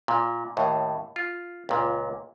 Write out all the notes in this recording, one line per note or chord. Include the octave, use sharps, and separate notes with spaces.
A#2
D#2 A2
F4
C#2 A#2